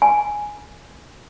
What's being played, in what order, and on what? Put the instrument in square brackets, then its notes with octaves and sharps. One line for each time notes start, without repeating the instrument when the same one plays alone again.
[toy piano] G#5